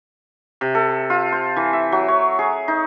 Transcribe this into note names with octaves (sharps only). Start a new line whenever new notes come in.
C3
A4
F4
C5
E3
E5
F#3
C#5
G#4
D#4